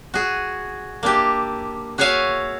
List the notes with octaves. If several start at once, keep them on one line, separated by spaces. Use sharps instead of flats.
F#4 G#4
A#3 D4 E4 G4
F#4 G#4 C#5 E5 F5 G#5